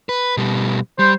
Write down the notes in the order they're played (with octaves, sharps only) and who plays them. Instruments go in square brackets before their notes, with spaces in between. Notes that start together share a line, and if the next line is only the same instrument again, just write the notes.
[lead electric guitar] B4
B2 G3
[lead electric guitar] G3 [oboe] C5